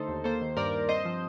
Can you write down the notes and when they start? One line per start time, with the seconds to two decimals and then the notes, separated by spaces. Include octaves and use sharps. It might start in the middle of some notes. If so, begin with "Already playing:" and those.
Already playing: D3 A3 D#4 A4 C5
0.08 D#2
0.24 A#3 A4 C5
0.41 D#3
0.57 G2 A#4 D5
0.73 G2
0.89 C4 C5 D#5
1.05 F3